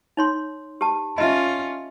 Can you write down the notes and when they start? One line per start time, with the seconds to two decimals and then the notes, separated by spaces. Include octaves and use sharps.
0.17 D#4 C#5 C6
0.81 G4 A5
1.18 C#4 F4 D#5 E5